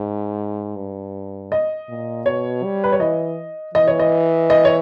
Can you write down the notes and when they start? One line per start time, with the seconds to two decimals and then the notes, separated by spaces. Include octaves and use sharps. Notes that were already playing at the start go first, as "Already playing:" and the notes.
Already playing: G#2
0.76 G2
1.52 D#5
1.89 A#2
2.25 B2 C#5
2.64 G3
2.84 B4
2.92 C#5
3.00 E3 D#5
3.75 E3 D#5
3.87 C#5
4.00 D#5
4.50 D#5
4.65 C#5